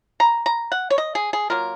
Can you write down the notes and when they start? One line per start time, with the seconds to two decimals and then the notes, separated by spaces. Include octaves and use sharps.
0.20 A#5
0.46 A#5
0.72 F#5
0.90 C#5
0.98 D#5
1.15 G#4
1.33 G#4
1.50 F#3 A#3 F4 A#4